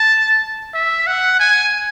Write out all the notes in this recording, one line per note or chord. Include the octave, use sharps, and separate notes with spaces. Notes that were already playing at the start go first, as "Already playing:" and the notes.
Already playing: A5
E5
F#5
G#5